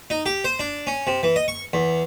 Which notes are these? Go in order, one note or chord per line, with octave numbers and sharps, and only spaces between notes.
D#4
G4
C5
D4
C#4
C3
E3
D#5
C#6
E2